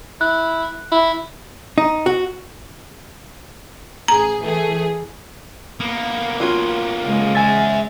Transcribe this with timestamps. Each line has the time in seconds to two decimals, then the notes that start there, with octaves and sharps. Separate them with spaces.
0.21 E4 F#6
0.92 E4
1.78 D#4
2.06 F#4
4.08 A1 G#4 A#5
4.42 E3 A3 G#4
5.80 A#3 B3
6.40 C#4 F4 F#4
7.03 C#3 G#3
7.35 E5 F#5 G#5 A6